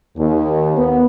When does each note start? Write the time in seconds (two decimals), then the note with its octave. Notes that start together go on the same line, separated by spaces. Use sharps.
0.17 D#2
0.76 B3